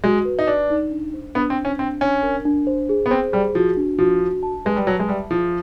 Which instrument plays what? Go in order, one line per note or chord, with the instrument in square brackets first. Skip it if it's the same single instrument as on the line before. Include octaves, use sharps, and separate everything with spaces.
[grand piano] G#3 [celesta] F#4
[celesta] B4
[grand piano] D#4
[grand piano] D4 [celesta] D5
[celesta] D#4
D4
C5
[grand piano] B3 [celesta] D4
[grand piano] C4
[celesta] C5
[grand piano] C#4
[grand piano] C4 [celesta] D4
[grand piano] C#4 [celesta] D4
[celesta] A#4
D4
C5
G#4
[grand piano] B3
[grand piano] C4 [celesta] C5
[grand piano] G3 [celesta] G#4
[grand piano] F3 [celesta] F#4
[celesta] D4
[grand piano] F3 [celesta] F#4
[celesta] D4
A5
[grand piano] G#3 [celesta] B4
[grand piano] G3
[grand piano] F#3 [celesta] A5
[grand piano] G#3
[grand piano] G3 [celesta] E5
[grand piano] F3 [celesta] G#4